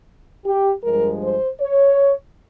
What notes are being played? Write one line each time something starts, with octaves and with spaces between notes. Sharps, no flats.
G4
G2 F3 G#3 A#4
C5
C#5